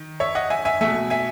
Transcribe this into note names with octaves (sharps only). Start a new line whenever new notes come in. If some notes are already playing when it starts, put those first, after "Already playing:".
Already playing: D#3
C#5 E5
D#5 F#5
E5 G#5
E5 G#5
B2 A3 E5 G#5
E5 G#5